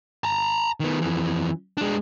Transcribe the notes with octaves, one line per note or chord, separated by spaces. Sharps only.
A5 A#5
D#3 B3
F2 E3
G#3 D4